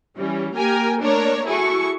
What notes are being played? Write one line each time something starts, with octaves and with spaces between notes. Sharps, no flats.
E3 G3 C#4
A#3 G4 A#4 G5 G#5
A3 A#3 D4 A#4 C#5
E4 F#4 G#4 A4 C#6